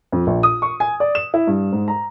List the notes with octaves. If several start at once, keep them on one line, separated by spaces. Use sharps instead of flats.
F2
A#1
D#6
C#6
G#5
D5
E7
E4
G2
G#2
A#5